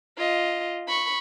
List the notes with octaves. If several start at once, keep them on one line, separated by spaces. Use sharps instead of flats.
F4 D#5
B5 C#6